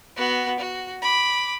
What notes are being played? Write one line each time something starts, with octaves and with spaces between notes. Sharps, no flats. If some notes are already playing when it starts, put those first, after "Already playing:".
B3 F#4
F#4
B5 D6